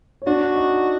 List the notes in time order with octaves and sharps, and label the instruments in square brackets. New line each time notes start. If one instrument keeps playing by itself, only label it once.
[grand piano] C#5
[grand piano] D4 D5 [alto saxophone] F#4
[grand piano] D#4 D#5